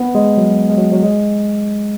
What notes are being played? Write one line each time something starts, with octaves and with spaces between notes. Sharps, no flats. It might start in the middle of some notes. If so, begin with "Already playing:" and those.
Already playing: B3
G#3
F#3
G#3
F#3
F#3
G#3